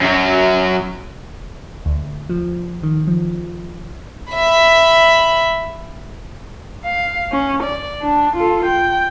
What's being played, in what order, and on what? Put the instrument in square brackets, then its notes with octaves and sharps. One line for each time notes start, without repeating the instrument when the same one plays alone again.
[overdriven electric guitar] F#2 F#3
[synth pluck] D2
F3
D#3
F3
[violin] E5 B5
[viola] F5
C#4
D5
D4
F4 A4
G5